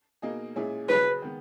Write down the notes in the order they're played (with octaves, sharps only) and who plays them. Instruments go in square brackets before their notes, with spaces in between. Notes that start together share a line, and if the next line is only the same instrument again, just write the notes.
[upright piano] B2 A#3 D#4 G#4
A#2 G#3 C#4 E4 G#4
[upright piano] C#3 F#3 C#4 G#4 [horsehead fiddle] B4
[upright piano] D#3 G#3 B3